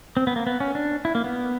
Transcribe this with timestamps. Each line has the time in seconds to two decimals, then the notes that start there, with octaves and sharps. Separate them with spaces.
0.17 C4
0.27 B3
0.36 A#3
0.47 B3
0.60 C#4
0.75 D4
1.05 E4
1.15 A#3
1.24 B3